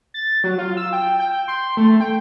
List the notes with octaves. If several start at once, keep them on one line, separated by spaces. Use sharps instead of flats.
A6
F#3
F4
E6
G5
G5
C6
A3
G5